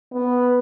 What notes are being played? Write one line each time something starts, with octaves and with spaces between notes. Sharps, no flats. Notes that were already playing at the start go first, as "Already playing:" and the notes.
B3